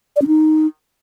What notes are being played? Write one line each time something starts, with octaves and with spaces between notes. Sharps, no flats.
D5
C#4
D#4